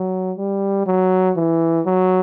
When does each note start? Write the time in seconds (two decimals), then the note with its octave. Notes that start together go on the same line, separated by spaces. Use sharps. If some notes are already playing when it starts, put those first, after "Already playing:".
Already playing: F#3
0.38 G3
0.87 F#3
1.36 E3
1.86 F#3